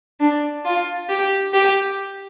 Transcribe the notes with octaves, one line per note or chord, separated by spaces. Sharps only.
D4
F4
G4
G4